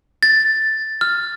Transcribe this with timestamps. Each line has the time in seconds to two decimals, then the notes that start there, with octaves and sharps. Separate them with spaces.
0.23 A6
1.01 F6